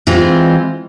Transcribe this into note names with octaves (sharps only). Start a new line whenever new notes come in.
E3 G#3 C4 F4